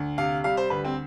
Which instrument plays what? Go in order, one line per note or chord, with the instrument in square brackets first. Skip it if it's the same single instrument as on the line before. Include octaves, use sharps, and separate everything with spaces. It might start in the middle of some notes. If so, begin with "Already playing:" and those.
Already playing: [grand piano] D2
C3 F5
G3 F5
C5
D2 B4
C4